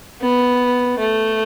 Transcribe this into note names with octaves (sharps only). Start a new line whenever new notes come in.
B3
A3